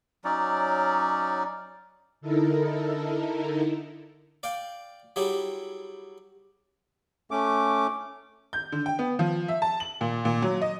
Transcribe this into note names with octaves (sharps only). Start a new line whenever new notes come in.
F#3 C#4 D#4 D5
D3 D#4 E4 A4 A#4
D5 F5 G5
F#3 G3 E4 G4 G#4
A3 C#4 D6
G6
D3
G5
B3
F3
E5
A5
F#7
A#2
A#2
F#3
D#5